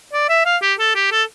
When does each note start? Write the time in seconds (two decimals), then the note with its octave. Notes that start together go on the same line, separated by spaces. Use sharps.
0.13 D5
0.29 E5
0.46 F5
0.62 G4
0.79 A4
0.95 G4
1.12 A4